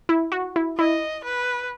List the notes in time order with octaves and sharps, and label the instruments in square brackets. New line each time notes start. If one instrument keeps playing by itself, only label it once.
[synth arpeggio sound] E4
F#4
E4
[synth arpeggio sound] E4 [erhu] D#5
[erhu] B4